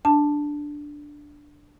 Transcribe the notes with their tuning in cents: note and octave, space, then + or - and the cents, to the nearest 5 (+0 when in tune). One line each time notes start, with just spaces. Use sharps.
D4 +0 A5 +0